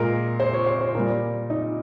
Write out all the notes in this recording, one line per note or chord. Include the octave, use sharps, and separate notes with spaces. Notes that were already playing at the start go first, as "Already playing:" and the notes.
Already playing: A#2 G#3 A#4
C5
C#5
C5
C5
A#2 G3 A#4
D#4